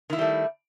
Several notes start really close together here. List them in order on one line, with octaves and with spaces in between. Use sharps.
D#3 E4 A#3 G3 A3